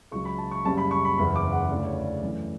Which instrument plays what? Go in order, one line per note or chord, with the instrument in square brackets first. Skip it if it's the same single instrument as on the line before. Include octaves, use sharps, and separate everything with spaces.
[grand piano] C#2 C#3 F#3 C#6
B5
A5
C#6
F#1 F#2 C#3 G3 A5
B5
C#6
B5
F#1 E2 C#3 B5
D6
F#5
D2 C#3 E3 A3 D5
C#5
D5
F#2 E3 A3